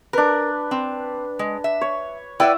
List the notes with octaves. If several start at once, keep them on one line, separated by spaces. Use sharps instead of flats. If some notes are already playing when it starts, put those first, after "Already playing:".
D4 A#4 B4
C4
G#3
E5
C#5
E4 B4 D5 E5 F#5 G5